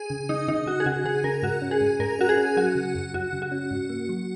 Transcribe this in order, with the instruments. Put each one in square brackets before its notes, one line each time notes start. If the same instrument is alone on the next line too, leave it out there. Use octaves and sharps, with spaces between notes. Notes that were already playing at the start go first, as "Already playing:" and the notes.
Already playing: [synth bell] G#4
[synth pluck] C#3
[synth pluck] C#3 [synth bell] D#4
[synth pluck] C#3 [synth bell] D#4
[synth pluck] C#3 [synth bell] F#4
[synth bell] G#4
[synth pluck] C#3 [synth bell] F#4
[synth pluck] C#3 [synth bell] G#4
[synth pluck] C#3 [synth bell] A#4
[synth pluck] G#2 [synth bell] F#4
[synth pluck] C#4
[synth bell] G#4
[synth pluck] G#2
[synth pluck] G#2 [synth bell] A#4
[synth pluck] C#4 [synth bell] F#4
[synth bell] G#4
[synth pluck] C#4
[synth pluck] F#3 [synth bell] F#4
[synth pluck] C#3
F#2
[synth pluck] F#2 [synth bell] F#4
[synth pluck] C#3
[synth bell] F#4
[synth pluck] C#4
G#2
A#3
F#3